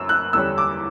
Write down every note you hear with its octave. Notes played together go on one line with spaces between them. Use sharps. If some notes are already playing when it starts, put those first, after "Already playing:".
Already playing: F#2 C#4 E6
F#6
E2 D3 G3 C#4 E6
D6